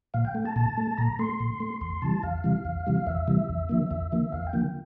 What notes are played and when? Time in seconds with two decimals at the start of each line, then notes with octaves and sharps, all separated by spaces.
0.14 A#2 F5
0.25 G5
0.35 A3
0.45 A5
0.56 A#2 A5
0.77 A3
0.98 A#2 A#5
1.19 A3 C6
1.40 A#2
1.60 A3
1.81 E2 C6
2.02 C3 E3 G3 A5
2.23 E2 F5
2.44 C3 E3 G3
2.65 E2
2.87 C3 E3 G3
3.07 E2 E5
3.28 C3 E3 G3
3.49 E2
3.69 D3 F3 A#3
3.91 E2 E5
4.12 D3 F3 A#3
4.32 E2 F5
4.47 G5
4.53 D3 F3 A#3